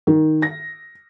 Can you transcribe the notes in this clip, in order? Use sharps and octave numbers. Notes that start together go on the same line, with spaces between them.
D#3
A#6